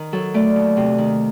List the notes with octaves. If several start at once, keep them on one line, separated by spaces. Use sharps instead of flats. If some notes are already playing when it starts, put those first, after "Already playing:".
Already playing: D#3
F#3 A4
A3 D5
D#2
C3
D#3